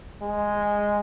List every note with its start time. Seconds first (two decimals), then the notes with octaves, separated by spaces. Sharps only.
0.22 G#3